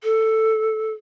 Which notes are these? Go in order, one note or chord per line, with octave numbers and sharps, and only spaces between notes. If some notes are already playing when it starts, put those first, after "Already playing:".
A4